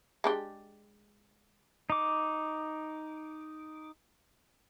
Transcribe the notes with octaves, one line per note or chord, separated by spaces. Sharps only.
G#3 D4 G4
D#4 D6